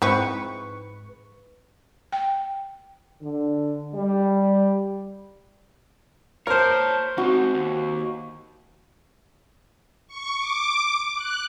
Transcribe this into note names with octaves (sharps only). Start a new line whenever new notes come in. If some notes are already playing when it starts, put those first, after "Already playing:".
G#2 F3 C4 E4 B4 C#6
G5
D3
G3
A#4 C5 C#5 A5 C#6
C4 D#4 F#4
D#2
C#6
D6
F#6